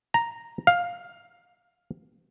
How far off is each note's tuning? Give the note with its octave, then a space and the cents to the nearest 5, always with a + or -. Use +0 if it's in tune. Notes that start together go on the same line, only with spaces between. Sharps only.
A#5 +0
F5 +10